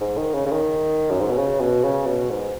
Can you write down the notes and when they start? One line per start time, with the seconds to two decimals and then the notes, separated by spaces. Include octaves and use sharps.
0.01 G#2
0.18 D#3
0.34 C#3
0.46 C#3
0.52 D#3
1.10 F#2
1.20 G#2
1.29 B2
1.38 C#3
1.61 B2
1.84 C#3
2.06 B2
2.30 G#2